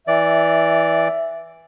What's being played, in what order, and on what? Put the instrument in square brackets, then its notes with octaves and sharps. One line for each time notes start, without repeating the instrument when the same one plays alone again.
[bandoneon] E3 D5 [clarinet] E5